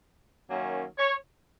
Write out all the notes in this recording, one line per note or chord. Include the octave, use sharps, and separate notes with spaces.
F#2 D#3 F#3 A#3 C#4
C#5